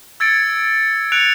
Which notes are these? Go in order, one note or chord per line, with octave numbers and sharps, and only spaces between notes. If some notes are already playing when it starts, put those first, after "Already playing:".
E6 G#6 A6 C#7 D7
F#6 C#7 D7 F7